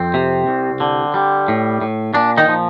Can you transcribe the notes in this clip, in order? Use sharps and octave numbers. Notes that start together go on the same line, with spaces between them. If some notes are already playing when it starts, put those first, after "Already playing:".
Already playing: F2 C4
C3
C2
D3
G3
A2
A2
A#2 D4
D#3 D#4
F3